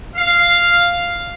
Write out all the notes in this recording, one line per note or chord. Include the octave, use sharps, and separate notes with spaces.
F5